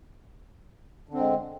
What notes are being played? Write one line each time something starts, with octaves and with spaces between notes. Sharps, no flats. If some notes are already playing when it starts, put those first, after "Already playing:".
D3 G#3 C4